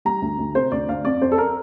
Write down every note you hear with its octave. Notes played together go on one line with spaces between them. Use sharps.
G3 A#5
D2
D2
C3 C5
D2 D5
D2 F5
F2 D5
F2 C5
A4
A#4